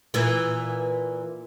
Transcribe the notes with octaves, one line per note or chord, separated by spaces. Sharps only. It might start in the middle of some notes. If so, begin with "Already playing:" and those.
A#2 E3